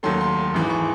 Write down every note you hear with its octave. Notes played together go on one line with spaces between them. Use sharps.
D#2 D#3 F#3 A3 C6
C6
G#1 G#2 E3
C#6